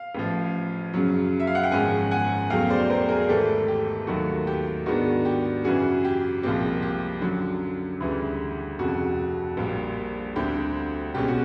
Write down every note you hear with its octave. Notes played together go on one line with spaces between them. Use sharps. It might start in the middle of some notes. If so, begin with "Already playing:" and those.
Already playing: F5
A1 A2 F3
F#2 C#3 F#3
E5
F5
F#5
G5
G#1 G#2 F3 G#3 C#4 F#5 G#5
F#5 G#5
E1 E2 C#3 F#3 A3 F5 G5
C5 D5
A#4 C5
G#4 A#4
G#1 G#2 E3 A3 G4 A4
G4
D#2 D#3 F#3 A3 F#4
G4
G#2 D#3 G#3 B3 D4 F#4
G4
F#2 C#3 E3 F#4 G#4
G4
C2 A#2 F3 G#3 C4 G4
G4
F#2 D3 F#3
D2 C#3 E3 G3
F1 F2 C#3 F#4
A#1 A#2 G3
D2 D3 G3 C4 G4
C2 B2 G#3 C#4 G4
F#4